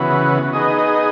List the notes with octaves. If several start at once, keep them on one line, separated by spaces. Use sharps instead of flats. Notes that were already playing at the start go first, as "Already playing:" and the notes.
Already playing: C#3 E3 B3 F#4
B3 D#4 G#4 D#5